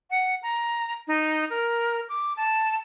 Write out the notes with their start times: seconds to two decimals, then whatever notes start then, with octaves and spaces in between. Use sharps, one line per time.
0.11 F#5
0.43 A#5
1.08 D#4
1.50 A#4
2.09 D6
2.37 A5